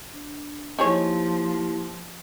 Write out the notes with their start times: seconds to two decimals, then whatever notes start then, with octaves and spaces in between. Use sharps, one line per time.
0.13 D4
0.79 F3 A#3 D#4 E4 G4 G#4 C#5